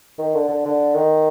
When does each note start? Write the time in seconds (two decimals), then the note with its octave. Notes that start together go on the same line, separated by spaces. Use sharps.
0.19 D#3
0.34 D3
0.49 D3
0.65 D3
0.95 D#3